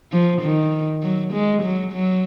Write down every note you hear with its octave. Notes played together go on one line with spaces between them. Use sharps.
F3
D#3
F#3
G#3
F#3
F#3